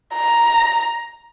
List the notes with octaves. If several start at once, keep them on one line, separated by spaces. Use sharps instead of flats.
A#5